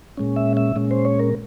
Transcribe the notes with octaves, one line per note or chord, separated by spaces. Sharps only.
A#2 G#3 C#4
E5
E5
A#2 G#3 C#4
C5
C#5
A#4